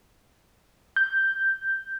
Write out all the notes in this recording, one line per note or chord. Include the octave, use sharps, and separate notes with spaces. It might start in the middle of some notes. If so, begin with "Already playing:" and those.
G6